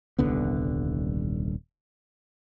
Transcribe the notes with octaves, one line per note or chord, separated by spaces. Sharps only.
D#1 C2 D3 B3